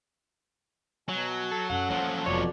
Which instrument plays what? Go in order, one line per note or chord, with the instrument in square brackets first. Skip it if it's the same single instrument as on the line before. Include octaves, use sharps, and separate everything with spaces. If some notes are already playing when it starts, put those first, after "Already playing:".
[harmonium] B2 G#5 [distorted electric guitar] F#3
[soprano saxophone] A4
[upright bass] F#2 [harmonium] C#4 A4 [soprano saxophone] F#5
[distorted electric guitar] F3 F#3 [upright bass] A#3
[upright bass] F1 [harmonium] F2 B2 D5 [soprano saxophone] C#5